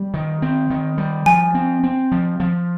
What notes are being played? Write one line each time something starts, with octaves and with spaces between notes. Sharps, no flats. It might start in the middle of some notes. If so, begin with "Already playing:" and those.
Already playing: G3
D#3
C4
D#3
G3
F3 G#5
C4
C4
F3
F3